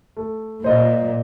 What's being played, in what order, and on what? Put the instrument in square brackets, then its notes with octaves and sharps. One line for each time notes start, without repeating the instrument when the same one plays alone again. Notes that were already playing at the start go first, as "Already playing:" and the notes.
[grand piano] A3
[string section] A#2 [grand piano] C5 D#5